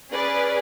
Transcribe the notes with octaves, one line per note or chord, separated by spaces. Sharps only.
C#4 G#4 B4 D5